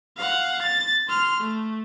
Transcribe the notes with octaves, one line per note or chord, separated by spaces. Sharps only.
F5 F#5
A6
C6 F6
A3